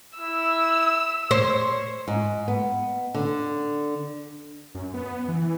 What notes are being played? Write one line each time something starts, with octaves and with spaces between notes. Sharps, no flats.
E4 E6
C5 C#5
G#2
B3
D3
F#2
B3
E3